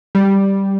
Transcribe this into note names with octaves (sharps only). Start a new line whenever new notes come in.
G3